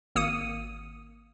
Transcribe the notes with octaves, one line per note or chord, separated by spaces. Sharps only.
G#1 A#3 D#6 C#7 D#7